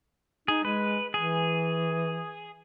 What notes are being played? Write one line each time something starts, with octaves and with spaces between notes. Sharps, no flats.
D#4 G#4
G#3 B4
E3 G#4